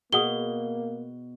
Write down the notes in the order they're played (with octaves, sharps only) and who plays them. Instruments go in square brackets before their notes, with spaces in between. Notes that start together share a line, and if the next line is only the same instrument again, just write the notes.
[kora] B2 [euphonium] A#3 [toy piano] G#4 F#5 D#6 [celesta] G7